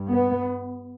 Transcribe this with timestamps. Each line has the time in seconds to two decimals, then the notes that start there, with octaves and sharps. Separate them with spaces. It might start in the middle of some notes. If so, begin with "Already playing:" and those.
Already playing: G2
0.09 B3